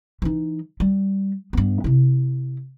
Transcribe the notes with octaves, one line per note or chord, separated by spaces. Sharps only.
E3 D#4
G3
G2 B3
C3 E4